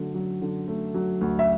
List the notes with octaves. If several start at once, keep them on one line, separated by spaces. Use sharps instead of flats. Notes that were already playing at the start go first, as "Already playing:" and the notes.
Already playing: D3 F#3 A3
F#3
D3
A3
F#3
D2
E5